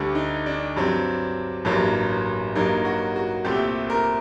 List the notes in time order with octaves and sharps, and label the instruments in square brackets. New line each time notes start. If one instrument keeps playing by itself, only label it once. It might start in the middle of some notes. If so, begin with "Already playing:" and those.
Already playing: [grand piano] D2 D3 G3
D#4
D4
G2 F#3 C4
A1 G2 F#3 A#3
G2 F#3 A#3 D#4
F#4
F#4
C2 A#2 A3 C4 G4
A#4